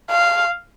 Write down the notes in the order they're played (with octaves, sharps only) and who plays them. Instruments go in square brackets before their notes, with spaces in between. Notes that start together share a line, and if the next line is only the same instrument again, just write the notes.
[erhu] F5